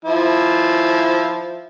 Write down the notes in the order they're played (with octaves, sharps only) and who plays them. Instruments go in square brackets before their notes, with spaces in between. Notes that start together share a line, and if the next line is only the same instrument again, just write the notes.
[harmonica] F3 E4